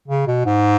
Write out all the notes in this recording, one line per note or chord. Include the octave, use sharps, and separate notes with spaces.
C#3
B2
G#2